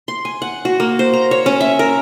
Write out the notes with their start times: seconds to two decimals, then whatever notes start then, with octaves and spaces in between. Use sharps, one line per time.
0.08 C6
0.25 G#5
0.42 F#5
0.65 F#4
0.80 A#3
0.99 C5
1.13 A#5
1.31 C#5
1.46 C#4
1.61 E5
1.79 A#4